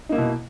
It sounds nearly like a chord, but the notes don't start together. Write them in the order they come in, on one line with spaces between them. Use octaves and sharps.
D#4 A#3 E4 B2